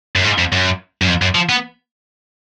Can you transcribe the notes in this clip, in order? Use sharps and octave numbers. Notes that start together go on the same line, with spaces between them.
F#2
G#2
F2
F#2
F#2
F2
F#2
F3
B3